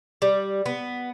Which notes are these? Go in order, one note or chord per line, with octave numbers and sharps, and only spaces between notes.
G3
B3